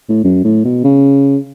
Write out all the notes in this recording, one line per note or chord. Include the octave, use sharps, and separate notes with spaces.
A2
F#2
A2
B2
C#3